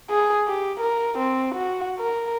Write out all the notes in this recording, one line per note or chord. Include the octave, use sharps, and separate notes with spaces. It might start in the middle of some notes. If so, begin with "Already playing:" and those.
G#4
G4
A#4
C4
F#4
A#4